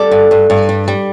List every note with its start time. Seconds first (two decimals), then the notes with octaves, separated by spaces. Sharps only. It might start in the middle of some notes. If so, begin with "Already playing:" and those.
Already playing: G3 A4 D5
0.11 G2
0.31 G2
0.50 G2
0.69 G3
0.88 G3